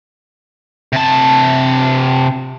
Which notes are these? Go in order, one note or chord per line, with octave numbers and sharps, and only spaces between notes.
C3 A5